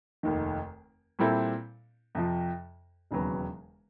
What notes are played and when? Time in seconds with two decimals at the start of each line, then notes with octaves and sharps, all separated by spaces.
0.23 F1 D#2 D#3
1.19 A#2 G3 C4 E4 A4
2.15 F2 C3 F3
3.11 E1 D#2 C#3 F#3 B3